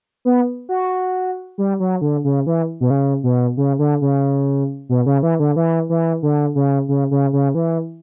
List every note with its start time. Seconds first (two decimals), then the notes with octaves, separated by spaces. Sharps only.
0.25 B3
0.69 F#4
1.58 G3
1.80 F#3
2.01 D3
2.24 C#3
2.46 E3
2.81 B2
2.90 C#3
3.23 B2
3.57 C#3
3.79 D3
4.01 C#3
4.89 B2
5.06 C#3
5.23 E3
5.40 D3
5.56 E3
5.89 E3
6.23 D3
6.55 C#3
6.88 C#3
7.11 C#3
7.33 C#3
7.55 E3